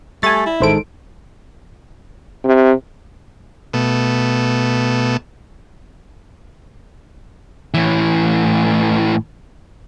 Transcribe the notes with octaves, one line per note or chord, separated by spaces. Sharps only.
G3 A3 G#5 A6
E4
A1 G#2 D#3 E3 G#3 A4 C5 D7
C3
B2 A3
A2 E3